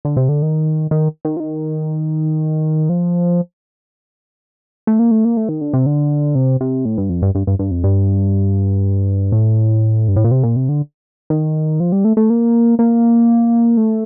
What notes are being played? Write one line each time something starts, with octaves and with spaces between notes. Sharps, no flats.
D3
C3
D3
D#3
D#3
D#3
F3
D#3
F3
A3
A#3
A3
A#3
A3
D#3
D3
C3
D3
C3
C3
A2
G2
F2
G2
G2
G2
G2
F2
G2
A2
G2
A2
A#2
C3
A#2
C3
D3
D#3
F3
G3
A3
A3
A#3
A#3
A3